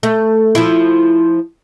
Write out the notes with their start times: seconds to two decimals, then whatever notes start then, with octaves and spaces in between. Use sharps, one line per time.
0.03 A3
0.55 F3 E4